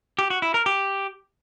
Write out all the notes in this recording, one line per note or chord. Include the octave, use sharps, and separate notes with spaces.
G4
F#4
E4
A#4
G4